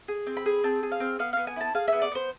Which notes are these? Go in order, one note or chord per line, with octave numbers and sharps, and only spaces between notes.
G#4
C4
B5
G#4
C4 A5
G#4
F5
C4
B3 F5
B3 F5
G#5
E4 A5
G#4 F5
B3 E5
D5
B3 C5